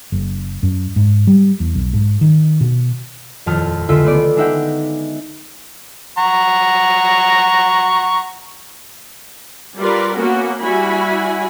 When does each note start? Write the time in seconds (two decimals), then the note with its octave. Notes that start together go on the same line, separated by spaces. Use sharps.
0.12 F#1
0.63 F#2
0.96 G#2
1.27 G3
1.60 E2
1.75 B1
1.93 G#2
2.21 D#3
2.61 B2
3.46 D#1 F2 A5 D#6 F6
3.89 C#2 D3 F4 A4 E5
4.03 A3 B3 D5
4.36 G#3 D4 D#4 E5 F#5 G5
6.18 F#5 A#5 C#6
9.78 G3 F4 A#4 B4 D5
10.16 A#3 B3 C#4 F#4 A#4
10.60 G3 E4 F#4 G#5 B5